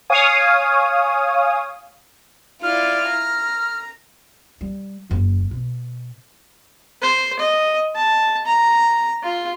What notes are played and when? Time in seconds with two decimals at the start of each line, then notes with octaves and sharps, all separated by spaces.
0.10 C#5 F5 G#5 D#6
2.63 E4 F4 D5 F6
3.08 A#5
4.61 G3
5.10 F#1 E2
5.51 B2
7.02 C5
7.39 D#5
7.96 A5
8.46 A#5
9.23 F4